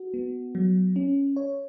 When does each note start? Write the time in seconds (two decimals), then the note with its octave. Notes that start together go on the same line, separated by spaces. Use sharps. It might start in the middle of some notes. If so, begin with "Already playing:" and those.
Already playing: F#4
0.14 B3
0.55 F#3
0.96 C#4
1.36 C#5